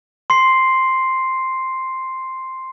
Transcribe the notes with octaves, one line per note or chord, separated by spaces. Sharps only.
C6 C7